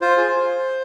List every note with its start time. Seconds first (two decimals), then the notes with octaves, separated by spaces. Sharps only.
0.01 F4 C5
0.17 G#4